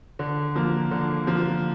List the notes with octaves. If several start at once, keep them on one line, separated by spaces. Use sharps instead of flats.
D3
F3 A#3
D3
F3 A#3